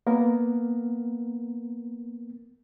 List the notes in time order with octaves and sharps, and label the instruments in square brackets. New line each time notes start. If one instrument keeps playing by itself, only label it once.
[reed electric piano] A#3 B3 A#4